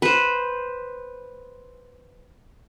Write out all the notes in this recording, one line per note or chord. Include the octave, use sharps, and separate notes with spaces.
B4 C5